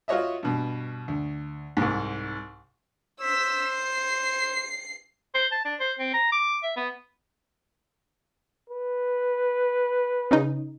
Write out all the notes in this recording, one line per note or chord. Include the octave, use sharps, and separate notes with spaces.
F4 F#4 C#5 D#5 E5
G2 B2
D2
C2 G#2
C5 E6 B6
C7
C5
A5
D4
C5
C4
A#5
D6
E5
B3
B4
C#3 C#4 D#4